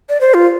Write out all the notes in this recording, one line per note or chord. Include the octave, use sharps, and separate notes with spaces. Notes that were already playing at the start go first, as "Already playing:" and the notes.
D5
C5
F4